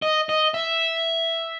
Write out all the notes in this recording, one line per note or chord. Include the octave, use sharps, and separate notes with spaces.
D#5
D#5
E5